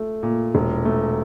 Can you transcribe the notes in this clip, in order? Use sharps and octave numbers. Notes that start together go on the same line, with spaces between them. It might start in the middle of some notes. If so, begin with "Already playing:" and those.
Already playing: A3 F4
A#2
E1
A3